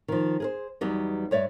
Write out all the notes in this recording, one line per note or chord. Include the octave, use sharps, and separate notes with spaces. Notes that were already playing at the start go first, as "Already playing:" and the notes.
D#3 F3
G#4 A#4 C5
E2 F#3 G3 B3 D#4
G2 C#5 D5 E5